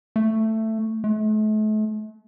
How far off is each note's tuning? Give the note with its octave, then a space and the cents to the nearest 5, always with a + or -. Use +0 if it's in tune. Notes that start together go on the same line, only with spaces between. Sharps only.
A3 +10
A3 -40